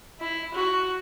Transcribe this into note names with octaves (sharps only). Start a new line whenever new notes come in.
E4
F#4